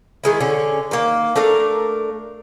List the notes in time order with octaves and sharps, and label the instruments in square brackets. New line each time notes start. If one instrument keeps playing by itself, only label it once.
[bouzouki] D#3 G#3 E4
D3 C#4
D#3 A#3
A3 D4 A#4 F5